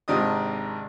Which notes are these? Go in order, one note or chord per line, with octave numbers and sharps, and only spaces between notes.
G#1 C3 D#3 D4 D#5 D#6